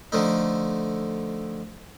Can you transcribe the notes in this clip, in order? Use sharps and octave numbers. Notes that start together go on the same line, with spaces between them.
D3 F3 A3 D#4